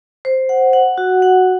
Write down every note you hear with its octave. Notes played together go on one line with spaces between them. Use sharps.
C5
F#5
F#5
F#4
F#5